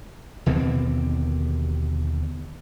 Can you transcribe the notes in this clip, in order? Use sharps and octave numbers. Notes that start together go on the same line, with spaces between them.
D#2 B2 D3 C4